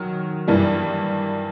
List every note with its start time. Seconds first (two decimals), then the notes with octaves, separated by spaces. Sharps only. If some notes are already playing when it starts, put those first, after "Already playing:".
Already playing: D#3 F#3
0.48 G2 E3 G3 A#3